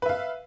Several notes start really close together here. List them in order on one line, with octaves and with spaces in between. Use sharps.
B4 E5 F5